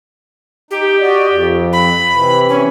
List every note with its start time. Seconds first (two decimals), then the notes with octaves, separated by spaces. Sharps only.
0.71 D#4 G4
1.01 F#4 D5 D#5
1.29 F2
1.73 B5
2.13 C3 E3
2.49 C#4